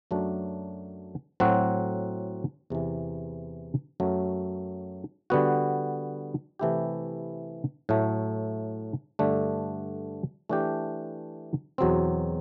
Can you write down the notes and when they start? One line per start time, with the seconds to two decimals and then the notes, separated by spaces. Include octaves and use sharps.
0.11 F#2 F#3 A3 D4
1.40 A2 F#3 C4 F#4
2.70 E2 C3 E3
4.00 F#2 F#3 A3
5.30 D3 G3 B3 F#4
6.59 C3 E3 A3 E4 G4
7.89 A2 F#3 A3
9.19 G2 D3 A3 D4
10.49 E3 A3 D4 G4
11.78 E2 B2 F#3 C4